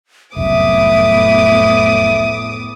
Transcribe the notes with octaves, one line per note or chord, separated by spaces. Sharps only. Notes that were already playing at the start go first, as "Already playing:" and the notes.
F1 C2 F#2 A2 B3 E5 D6 D#6